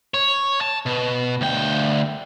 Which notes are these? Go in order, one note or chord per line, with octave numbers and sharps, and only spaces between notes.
C#5
A5
B2
D2 G5